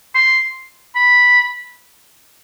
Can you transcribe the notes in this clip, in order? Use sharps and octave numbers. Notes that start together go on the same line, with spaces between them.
C6
B5